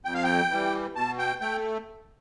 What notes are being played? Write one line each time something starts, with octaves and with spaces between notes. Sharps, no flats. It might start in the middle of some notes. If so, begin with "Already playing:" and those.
F2 G5
F5
G5
E3 G3
B2 A5
G5
A3 G5